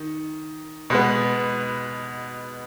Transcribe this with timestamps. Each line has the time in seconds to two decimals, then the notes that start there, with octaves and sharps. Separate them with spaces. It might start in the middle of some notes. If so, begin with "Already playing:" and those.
Already playing: D#3
0.90 B2 G#3 B3